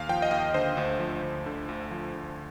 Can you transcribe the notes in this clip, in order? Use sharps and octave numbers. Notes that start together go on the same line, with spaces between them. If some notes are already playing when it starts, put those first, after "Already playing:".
Already playing: D#2 F5
F3 G5
D#5
D#2 F5
D3 C5
D2
F3
D2
D3
D2
F3
D2